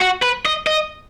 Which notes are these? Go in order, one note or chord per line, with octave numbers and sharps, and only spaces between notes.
F#4
B4
D#5
D#5